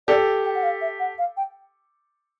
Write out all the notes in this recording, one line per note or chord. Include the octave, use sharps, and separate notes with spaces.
G4 A4 D5
G5
F#5
F5
E5
F#5
F5
G5